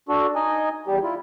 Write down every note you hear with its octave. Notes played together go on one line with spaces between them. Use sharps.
D4 F#4 A4
D#4 D#5 G#5
E2 G3 G4
E4 F4